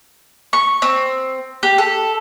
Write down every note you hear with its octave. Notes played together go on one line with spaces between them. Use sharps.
C#6
C4
G4
A4